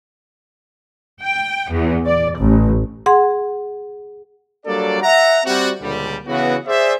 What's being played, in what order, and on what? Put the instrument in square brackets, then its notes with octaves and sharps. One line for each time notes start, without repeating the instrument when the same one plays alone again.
[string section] G5
E2
D5
A1
[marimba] G#4 F#5 C6
[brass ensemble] F#3 G3 A#3 D4 A4 D5
E5 F#5 A#5
G3 C4 F#4
C#2 A#2 D3 G3
C#3 E3 B3 F#4
G#4 C5 D5 E5